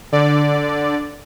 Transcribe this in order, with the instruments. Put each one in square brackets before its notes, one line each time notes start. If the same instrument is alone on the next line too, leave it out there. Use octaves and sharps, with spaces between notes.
[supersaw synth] D3 D5